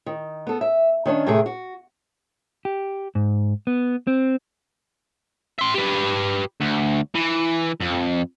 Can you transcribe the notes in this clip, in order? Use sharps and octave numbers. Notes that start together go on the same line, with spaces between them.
D#3
B3 A4
E5
D#3 C#4 D4
A2 C3 D#3 A3 G#4
F#4
G4
G#2
B3
C4
E5 C6
G4 B4
D2
E3
F2